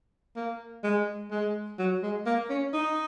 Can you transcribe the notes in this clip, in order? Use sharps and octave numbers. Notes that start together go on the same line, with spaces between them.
A#3
G#3
G#3
F#3
G#3
A#3
C#4
D#4